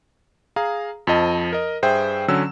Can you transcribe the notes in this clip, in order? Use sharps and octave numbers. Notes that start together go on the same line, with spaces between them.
G#4 F5 A#5
F2 F3 D#5 A5
A#4 D#5
G2 G#4 C5 E5 G5
D3 F#3 C#4 E6